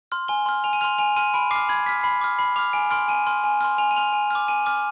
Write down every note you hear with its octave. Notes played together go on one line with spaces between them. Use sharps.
C6 F6
G#5 G7
C6 F6
G#5 F7
D#7
C6 F6 F7
G#5 F7
C6 F6 D#7
B5 D7
D6 F6 C7
B5 G#6
D6 F6 B6
B5 C7
D6 F6
B5 C7
D6 F6 F7
G#5 D7
C6 F6 D7
G#5 D#7
C6 F6
G#5
C6 F6
G#5 F7
D#7
C6 F6 F7
G#5
D6 F6
G#5 D#7
D6 F6